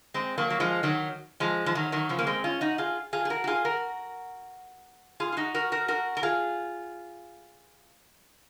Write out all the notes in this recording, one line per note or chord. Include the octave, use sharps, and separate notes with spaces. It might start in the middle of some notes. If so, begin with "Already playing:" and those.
G#3 C4
F#3 A#3
F#3
F3 G#3
D#3 F#3
F3 G#3
F3
D#3 F#3
D#3 F#3
C#3 F3
A#3
G#3 C4
C#4 F4
D#4 F#4
F4 G#4
F4 G#4
G#4
F#4 A#4
F#4
F4 G#4
F#4 A#4
F4 G#4
F4
D#4 F#4
F#4 A#4
F#4 A#4
F#4 A#4
A#4
F4 G#4